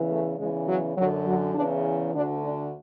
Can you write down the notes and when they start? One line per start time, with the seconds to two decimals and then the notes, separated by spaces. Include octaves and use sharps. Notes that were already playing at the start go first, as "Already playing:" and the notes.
Already playing: E2 C#3 E3
0.09 A3
0.38 E2 C#3 E3 G#3
0.67 F#3
0.96 F#2 F#3
1.00 D3
1.25 F#3
1.54 E2 C#3 E3 D4
2.13 D2 D3 D4
2.42 D4